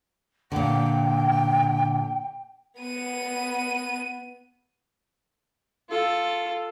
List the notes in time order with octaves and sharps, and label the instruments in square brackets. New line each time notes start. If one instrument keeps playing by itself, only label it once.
[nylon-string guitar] A#2 D3 [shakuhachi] G5
[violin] B3 D#7
[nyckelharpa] F4 A4